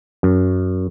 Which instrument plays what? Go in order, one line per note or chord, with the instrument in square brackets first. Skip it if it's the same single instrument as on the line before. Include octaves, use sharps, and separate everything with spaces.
[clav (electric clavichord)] F#2